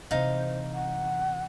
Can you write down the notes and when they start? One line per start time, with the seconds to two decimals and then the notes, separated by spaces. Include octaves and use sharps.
0.11 C3 E3 D#4 C5 F5
0.74 F#5